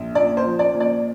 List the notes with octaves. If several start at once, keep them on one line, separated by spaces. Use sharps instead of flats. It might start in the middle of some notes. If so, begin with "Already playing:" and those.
Already playing: A#1
A#2 D5
C5
F3
D5
A#2
D5